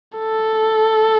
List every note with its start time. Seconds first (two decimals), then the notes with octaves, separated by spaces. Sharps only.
0.18 A4